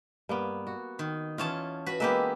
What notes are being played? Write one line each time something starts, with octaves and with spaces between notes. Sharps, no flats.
G2 A#3 B3
F#4
D#3
E2 C#4 F4 A5
F#4 B4 B5
G#3 A#3 B3 G4 B4 E5